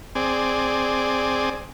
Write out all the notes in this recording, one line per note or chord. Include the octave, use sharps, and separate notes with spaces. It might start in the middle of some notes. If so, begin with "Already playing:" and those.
C4 G#4 D5